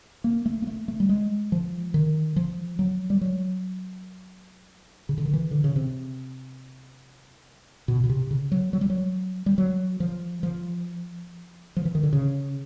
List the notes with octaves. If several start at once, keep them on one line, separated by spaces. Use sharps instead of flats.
A#3
A3
A#3
A3
A3
G3
G#3
F3
D#3
F3
F#3
G3
F#3
C#3
D3
D#3
E3
D3
C#3
C3
B2
B2
C3
C#3
F#3
F#3
G3
F#3
G3
F#3
F3
F3
F3
E3
D#3
D3
C#3